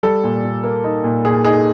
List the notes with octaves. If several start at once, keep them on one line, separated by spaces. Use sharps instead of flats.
G3 A4
A#2
A#2
A#3
D#4
A#2
A#2 G#4
D#4 G#4